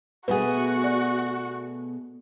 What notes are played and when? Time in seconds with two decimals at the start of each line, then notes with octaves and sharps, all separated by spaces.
0.28 B2 A3 F#4 G#4 B4 F#5
0.84 D5